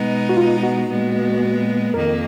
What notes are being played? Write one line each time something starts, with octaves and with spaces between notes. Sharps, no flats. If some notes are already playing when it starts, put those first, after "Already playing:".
Already playing: B2 G#3 B3 D#4
F#4
F4
F#4
A#2 G#3 B3
F2 D#3 A#3 A#4